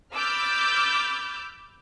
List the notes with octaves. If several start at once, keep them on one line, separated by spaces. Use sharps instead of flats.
B5 D6 E6 F6 G6 A6